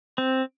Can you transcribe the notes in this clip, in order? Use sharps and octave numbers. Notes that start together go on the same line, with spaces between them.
C4